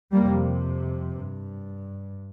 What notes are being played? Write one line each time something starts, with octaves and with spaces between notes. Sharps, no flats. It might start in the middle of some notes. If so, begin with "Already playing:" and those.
F2 C3 G3 A#3
G2